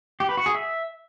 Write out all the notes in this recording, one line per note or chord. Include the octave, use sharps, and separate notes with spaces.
G4
B4
F#4
G#4
E5